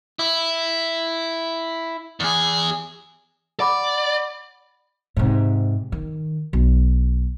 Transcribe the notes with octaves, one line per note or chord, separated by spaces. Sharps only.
E4
E2 G#4
D5 F#5 B5 D6
G#2 C3
D#3
B1